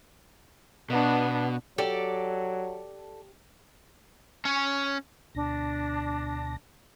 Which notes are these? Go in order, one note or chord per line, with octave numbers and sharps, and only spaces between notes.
B2 B3 D4
F#3 G4 A4 D5
C#4 C#5
D2 B2 D4 A#6